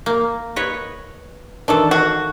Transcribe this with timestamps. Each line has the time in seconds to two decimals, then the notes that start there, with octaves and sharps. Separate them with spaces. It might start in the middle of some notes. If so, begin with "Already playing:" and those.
0.06 A#3
0.56 B4 C#5 D#5
1.68 D#3 E3 D4 A4
1.91 F#4 F5